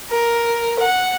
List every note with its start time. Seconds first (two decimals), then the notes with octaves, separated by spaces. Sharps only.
0.11 A#4
0.80 F#5